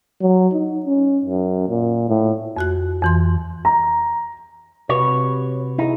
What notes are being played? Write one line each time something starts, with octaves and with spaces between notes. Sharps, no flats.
F#3
D#4
C#4
F#2
A#2
A2
F2 F#4 F#6
F2 E3 C6
A#5
C3 F#4 B4 C#5
D#4 E4 G#4